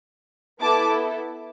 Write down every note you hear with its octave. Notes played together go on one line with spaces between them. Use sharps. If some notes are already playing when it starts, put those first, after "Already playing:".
B3 E4 A4 A5 D6